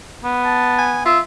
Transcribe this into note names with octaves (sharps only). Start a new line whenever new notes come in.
B3
A5
G#5
F4 E5